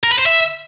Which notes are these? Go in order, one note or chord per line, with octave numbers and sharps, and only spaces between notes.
A#4
B4
C5
E5